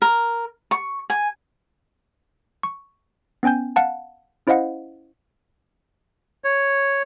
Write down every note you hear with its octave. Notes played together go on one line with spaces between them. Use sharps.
A#4
C#6
G#5
C#6
B3 C#4 G5 G#5 G6
F5 F#5 A5
C#4 E4 C5 D#5 F5 F#5
C#5